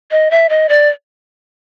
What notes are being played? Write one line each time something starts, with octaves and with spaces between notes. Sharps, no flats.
D#5
E5
D#5
D5